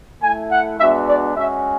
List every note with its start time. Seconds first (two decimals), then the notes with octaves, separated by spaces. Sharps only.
0.23 A3 E4 G#5
0.51 F#5
0.79 G#3 B3 D4 F#4 E5
1.08 D5
1.36 G#3 C#4 F#4 E5